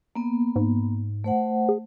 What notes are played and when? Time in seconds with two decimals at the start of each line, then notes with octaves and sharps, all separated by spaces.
0.15 A#3 B3
0.56 G#2
1.24 A3 C5 F#5
1.69 G#4